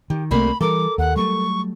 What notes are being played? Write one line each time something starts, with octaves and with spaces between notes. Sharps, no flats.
D#3 G4
C2 C3 G3 A3 A#3 C4 B5
E3 G3 A4 A#4 D6
D#2 F#5
F#3 G3 A3 C#6